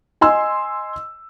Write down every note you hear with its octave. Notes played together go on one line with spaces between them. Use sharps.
D#5 G#5 C6 E6